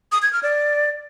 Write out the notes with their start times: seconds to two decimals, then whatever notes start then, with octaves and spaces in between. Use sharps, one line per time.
0.12 D#6
0.22 G#6
0.33 F6
0.43 D5